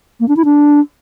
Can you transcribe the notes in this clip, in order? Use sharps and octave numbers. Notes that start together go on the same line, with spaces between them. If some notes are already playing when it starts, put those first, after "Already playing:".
A#3
D4
E4
D4